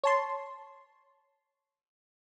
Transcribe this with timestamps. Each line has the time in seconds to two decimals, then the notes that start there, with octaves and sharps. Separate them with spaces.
0.04 C#5 A5 C6